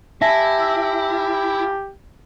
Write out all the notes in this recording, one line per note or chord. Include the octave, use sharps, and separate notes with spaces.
E4 G4 E5 G#5 A5 A#6